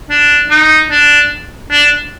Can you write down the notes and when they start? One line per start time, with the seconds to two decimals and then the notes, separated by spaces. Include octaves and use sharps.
0.10 D4
0.50 D#4
0.91 D4
1.71 D4